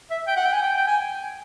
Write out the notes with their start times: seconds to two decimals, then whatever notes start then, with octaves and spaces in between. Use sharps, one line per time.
0.10 E5
0.27 G5
0.36 F#5
0.45 G5
0.53 G#5
0.62 G5
0.77 G5
0.87 G#5